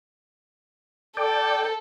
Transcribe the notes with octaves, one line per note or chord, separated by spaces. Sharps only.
A4 D5 G5